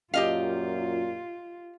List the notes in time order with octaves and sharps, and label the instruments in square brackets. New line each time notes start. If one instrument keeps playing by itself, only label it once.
[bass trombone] F#2 [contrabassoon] A#2 [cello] F4 [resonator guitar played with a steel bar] G4 D#5 F5